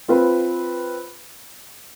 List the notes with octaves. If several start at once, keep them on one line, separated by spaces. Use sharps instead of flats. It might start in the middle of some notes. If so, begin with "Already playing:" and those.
C4 F4 B4